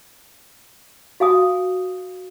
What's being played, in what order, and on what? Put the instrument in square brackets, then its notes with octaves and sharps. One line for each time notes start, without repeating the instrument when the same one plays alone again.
[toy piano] F#4 F5 G#5 D#6